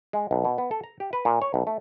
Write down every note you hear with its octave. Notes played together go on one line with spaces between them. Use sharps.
G#3
B1
B2
B3
A4
A#5
G4
B4
A#2
C#5
B1
A3